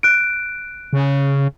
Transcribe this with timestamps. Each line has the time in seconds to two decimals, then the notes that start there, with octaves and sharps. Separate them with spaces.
0.03 F#6 D7
0.93 C#3